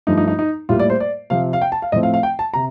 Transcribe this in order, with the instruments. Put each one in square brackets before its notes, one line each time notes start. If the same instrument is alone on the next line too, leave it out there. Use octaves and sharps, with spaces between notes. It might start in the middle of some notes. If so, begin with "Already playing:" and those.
[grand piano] G2 F3 A3 D#4
D#4
D#4
D#4
A2 G3 A#3 F4
D5
C5
D5
C3 F3 C4 F5
F5
G5
A5
F5
A2 F3 A3 C4 D#5
F5
F5
G5
A5
C3 A#5